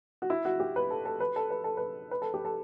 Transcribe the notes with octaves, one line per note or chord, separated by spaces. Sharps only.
F#4
E4
F#4
G4
B4
A4
A4
B4
A4
B4
A4
B4
B4
A4
G4
A4